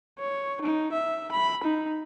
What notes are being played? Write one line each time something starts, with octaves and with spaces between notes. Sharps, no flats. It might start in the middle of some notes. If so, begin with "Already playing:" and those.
C#5
D#4
E5
B5
D#4